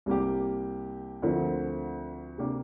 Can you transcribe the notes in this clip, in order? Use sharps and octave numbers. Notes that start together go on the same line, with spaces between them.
C2 C3 A#3 G4
D2 D3 F3 C4 A#4
C3 A#3 D4 G4